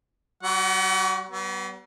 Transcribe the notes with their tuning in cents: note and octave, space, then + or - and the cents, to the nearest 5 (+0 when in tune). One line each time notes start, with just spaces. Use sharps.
G3 -45 F#4 +0 F#5 +35
G3 -45 B3 -5